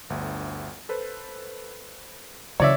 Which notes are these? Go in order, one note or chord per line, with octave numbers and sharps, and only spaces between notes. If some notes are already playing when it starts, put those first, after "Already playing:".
G1 D2
A4 B4 C5
C#3 E3 F#3 C#5 D5 E5